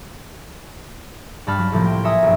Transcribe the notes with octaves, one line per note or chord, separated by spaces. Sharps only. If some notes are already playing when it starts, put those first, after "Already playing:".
G2 G3 A5 B5 F6
F#3
C2 A2 F3 A#3
G5
C#5 E5 G#5 A#5 D#6
B1 G2